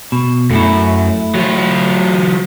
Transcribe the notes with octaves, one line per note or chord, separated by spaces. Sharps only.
B2
F#2 A3 E4
F#3 F4